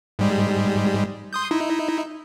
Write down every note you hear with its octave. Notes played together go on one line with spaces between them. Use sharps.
G#2 G3 G#3
C6 D#6 G6
D#4 E4